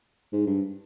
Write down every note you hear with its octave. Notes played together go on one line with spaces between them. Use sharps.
G#2
G2